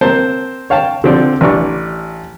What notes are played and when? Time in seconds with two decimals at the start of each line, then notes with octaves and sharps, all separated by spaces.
0.01 A#3 C4 C5 A5
0.70 C#5 F5 G5 A5
1.04 D3 F3 C4 D4
1.41 A1 D4 C#6